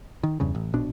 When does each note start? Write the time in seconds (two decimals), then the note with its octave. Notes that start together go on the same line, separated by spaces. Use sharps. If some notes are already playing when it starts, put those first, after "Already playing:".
0.23 D#3
0.40 E2 G2 C#3
0.55 A1
0.74 A#1 B2 D4